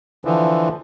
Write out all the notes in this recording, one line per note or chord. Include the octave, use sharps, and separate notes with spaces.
D3 E3 F3